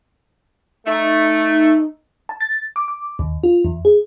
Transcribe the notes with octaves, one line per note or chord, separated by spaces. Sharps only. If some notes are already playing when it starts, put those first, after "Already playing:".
A3 D#4
A5
A6
D6
D6
D#2
F4
E2
G#4